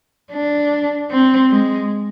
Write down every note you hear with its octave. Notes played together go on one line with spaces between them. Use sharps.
D4
C4
G#3